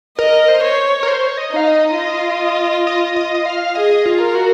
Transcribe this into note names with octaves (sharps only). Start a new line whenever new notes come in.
A#4 D#5
C5
C#5
A#4
C5
C#5
D#5
D#4 F5
D#5
F4
D#5
D#5
D#5
F5
G#4 D#5
F4
A#4
F#4